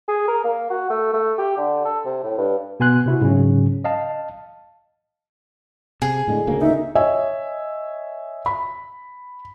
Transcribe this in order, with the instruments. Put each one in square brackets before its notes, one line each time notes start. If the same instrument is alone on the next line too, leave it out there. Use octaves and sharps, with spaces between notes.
[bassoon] G#4
A#4
A#3
F#4
A3
A3
G4
D3
A4
C3
A2
G2
[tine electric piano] B2 B3 G#5 C6 F#6
C3 E4 F#4
G#2 C#3 F#3 C#4
D#5 F5 A5
[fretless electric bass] C3 [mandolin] G#4
[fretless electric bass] A2 D3 G#3
D2 C#3 A#3
[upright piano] D#4 [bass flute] E5
[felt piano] C#5 D#5 E5 G#5
B5